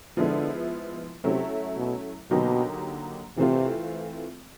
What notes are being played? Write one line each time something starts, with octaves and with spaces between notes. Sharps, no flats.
D3 F3 G#3 B3 E4
C3 F#3 A3 C#4 E4
B2
B2 D3 F#3 A#3 D#4 G4
C3 E3 A3 C4 F4